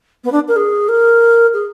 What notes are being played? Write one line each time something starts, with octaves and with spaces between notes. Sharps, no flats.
B3
D4
A#4
G#4
A#4
G#4